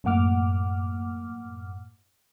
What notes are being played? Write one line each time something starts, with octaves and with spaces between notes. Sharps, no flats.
F#2 A2 A#3 F#5 D6 F6